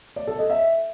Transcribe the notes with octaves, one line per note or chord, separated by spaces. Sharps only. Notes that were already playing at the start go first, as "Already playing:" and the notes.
D5
A4
D#5
E5